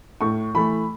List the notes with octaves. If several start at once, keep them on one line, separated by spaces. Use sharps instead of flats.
A2 C#6
E3 A3 B5